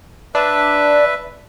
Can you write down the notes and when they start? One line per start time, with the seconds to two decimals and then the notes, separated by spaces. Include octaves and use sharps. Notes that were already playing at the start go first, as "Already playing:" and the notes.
0.35 D4 B4 E5